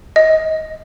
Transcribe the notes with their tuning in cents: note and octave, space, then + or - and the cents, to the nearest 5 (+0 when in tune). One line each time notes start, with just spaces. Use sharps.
D#5 +25